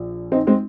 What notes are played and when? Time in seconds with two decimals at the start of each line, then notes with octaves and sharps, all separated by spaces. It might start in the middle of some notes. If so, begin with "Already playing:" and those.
Already playing: A#1 A#2
0.32 C4 D#4
0.47 G#3 C4